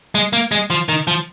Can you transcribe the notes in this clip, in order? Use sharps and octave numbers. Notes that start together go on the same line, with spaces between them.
G#3
A#3
G#3
F3
D#3
F3